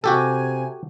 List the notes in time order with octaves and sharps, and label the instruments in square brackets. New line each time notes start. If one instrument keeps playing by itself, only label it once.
[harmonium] C3 G#5 [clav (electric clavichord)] F#4 G4 A4